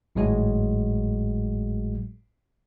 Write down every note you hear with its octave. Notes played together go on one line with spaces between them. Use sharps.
G#1 A2 F#3 G#3 F#4